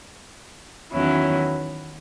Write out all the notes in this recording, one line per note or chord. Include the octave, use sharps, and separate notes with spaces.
E2 D#3 F#3 C#4 E4